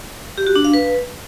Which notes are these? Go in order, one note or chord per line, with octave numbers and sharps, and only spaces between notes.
G4
F#4
D4
F5
B4